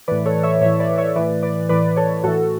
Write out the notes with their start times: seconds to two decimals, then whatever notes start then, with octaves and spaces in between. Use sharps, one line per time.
0.08 A2 E3 B4 D5
0.26 A4 C#5
0.43 C#5 E5
0.61 A2 E3 C#5 E5
0.80 B4 D5
0.98 C#5 E5
1.16 A2 E3 B4 D5
1.43 B4 D5
1.69 A2 E3 B4 D5
1.96 A4 C#5
2.24 A2 E3 F#4 A4